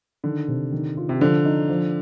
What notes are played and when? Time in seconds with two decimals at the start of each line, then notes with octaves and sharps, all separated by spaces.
0.24 D3 D#3
0.48 C3
0.72 D#3
0.97 F4
1.09 C3
1.20 D3 F3
1.45 D#4
1.68 F3